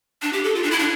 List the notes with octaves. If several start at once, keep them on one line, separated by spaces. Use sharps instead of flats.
D4
G4
A4
F4
D4
E4
D4